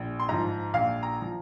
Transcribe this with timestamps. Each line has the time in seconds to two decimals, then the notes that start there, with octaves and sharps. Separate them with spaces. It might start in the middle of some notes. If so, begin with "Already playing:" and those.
Already playing: A#1
0.19 C6
0.29 G#2 F3 A#5
0.73 A#1 F5
1.03 A#5
1.22 F3